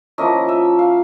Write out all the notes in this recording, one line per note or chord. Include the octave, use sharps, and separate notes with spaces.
F3 A#3 C#4 E4 D#5
E5
F5